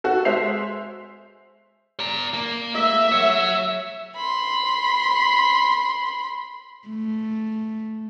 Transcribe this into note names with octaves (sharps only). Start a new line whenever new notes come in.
F#4 A4
G#3 C5 E5 C7 F7
D5 A#5
A#3
E5
F#3 C#5
B5 C6
A3